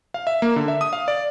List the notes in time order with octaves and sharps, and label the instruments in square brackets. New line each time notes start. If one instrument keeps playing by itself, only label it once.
[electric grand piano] F5
E5
A#3
D3
E5
D#6
F5
D5